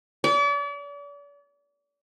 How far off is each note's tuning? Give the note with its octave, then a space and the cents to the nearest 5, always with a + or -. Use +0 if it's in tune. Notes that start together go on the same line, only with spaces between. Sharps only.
D5 -40